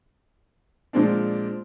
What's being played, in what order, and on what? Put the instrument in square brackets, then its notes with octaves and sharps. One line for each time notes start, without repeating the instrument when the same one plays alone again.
[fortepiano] A#2 F3 G#3 C4 D4